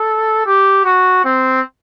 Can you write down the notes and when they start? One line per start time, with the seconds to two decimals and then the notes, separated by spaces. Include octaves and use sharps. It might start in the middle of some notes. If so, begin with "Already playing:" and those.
Already playing: A4
0.46 G4
0.85 F#4
1.25 C4